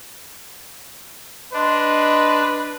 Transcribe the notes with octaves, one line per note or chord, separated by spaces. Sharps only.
D4 B4 D#5 C6